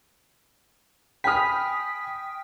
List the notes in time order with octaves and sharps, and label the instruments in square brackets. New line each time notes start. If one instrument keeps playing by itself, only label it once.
[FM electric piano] G5 [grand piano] G#5 B5 F6 [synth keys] D#6 B6